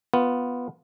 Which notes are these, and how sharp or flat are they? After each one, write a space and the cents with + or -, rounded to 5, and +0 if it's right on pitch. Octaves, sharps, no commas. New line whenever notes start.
B3 +0 F4 +0